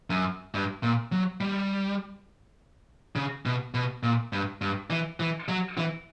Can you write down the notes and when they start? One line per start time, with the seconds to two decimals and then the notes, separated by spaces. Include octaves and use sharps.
0.10 F#2
0.54 G2
0.83 A#2
1.12 F#3
1.41 G3
3.16 C#3
3.46 B2
3.74 B2
4.03 A#2
4.33 G2
4.62 G2
4.90 E3
5.20 E3
5.48 F#3
5.78 E3